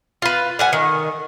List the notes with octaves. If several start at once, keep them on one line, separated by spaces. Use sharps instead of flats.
F4 B4
G3 F#5 G#5
D#3